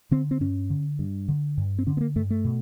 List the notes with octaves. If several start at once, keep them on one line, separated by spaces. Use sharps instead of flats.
D3 C4
C4
G2 C#4
D3
G2
D3
G2
C4
D3 C#4
B3
A#3
G2 A3
A3
B2